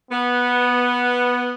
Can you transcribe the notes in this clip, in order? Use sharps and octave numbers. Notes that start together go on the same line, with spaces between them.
B3